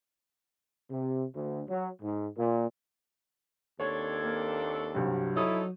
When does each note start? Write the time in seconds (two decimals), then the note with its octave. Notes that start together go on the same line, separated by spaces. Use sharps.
0.90 C3
1.35 D2
1.68 F#3
2.02 G#2
2.37 A#2
3.80 D#2 C4 D4 A4 C#5 G#6
4.24 A#3
4.64 C#6
4.95 C2 G2 F#3
5.36 F3 D#4 E4 A4 C#5 D#6